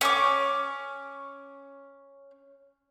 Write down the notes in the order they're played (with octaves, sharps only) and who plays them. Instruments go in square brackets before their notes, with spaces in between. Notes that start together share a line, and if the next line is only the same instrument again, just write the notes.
[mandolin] C#4 C#6 D6